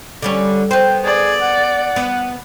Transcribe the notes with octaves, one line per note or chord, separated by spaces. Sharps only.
D3 G3 C#4
B3 C5 G5
G#4 D5
F#5
B3